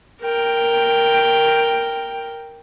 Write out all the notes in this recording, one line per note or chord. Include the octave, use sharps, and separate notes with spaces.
A#4 G5